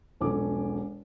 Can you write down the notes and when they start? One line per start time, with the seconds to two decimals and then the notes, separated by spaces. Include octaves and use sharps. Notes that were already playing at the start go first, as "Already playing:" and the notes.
0.21 E1 B1 F3 C#4 A4 D6